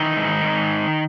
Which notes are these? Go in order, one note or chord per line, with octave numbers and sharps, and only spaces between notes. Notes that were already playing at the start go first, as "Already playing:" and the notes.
Already playing: D#3 E3 D#4
G#2
G#2